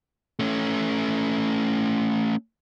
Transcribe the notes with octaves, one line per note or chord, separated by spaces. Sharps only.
A3 C#4